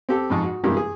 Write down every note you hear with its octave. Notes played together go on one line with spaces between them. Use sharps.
C4 G4 A4
F2 G#2 A5 C#6
F#4
G2 C3 E3 G#3 A#3 G4
G#4